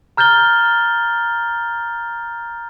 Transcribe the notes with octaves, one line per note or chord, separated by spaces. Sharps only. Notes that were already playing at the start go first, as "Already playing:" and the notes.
A#5 F6 G6 A6 G7